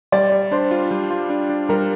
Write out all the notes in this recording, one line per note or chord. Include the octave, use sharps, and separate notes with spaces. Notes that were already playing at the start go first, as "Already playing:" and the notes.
G3 D5
G3
D4 C5
F4
G3
F4
D4
D4
G3 A#4